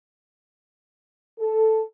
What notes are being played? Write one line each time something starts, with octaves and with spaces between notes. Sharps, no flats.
A4